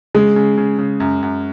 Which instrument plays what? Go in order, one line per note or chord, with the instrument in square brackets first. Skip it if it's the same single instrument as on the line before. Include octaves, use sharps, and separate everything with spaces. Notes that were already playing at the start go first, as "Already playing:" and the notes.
[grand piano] C#3 [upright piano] G#3
[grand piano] C#3
C#3
C#3
F#2
F#2